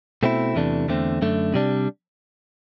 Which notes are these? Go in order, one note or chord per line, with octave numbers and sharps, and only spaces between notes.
B2 A3 C4 E4
E2 C3 E3 A3 D4
E2 D3 A3 C4
F#2 D3 A3
C3 G3 D4